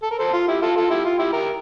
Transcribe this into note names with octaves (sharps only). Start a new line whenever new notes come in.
A4
A#4
A4 C5
F4
E4 G4
F4 A4
F4 A4
E4 G4
F4
E4 G4
G4 A#4